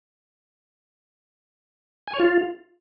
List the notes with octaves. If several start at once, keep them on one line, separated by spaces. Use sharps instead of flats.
G#5
C#5
F4